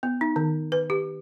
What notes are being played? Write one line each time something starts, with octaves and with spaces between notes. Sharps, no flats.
B3
D#4
D#3
B4
G4